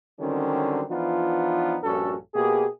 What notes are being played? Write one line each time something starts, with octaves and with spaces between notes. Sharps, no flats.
D3 D#3 F#3 G3 C4 C#4
E3 F3 B3 D4 D#4 F4
A#1 G2 C#4 F#4 A4
B2 A#3 G4 G#4